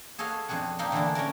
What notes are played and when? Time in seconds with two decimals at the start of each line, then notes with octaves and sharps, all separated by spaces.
0.18 G#4 A4 C#5 D#5 F5 F#5
0.48 F2 B2 D4 G#4 F#5
0.79 A#3 D#4 A4 F5 G5 B5
0.92 D3 E3 A3 A#3 D4 E4
1.15 C#4 A4 A#4 D5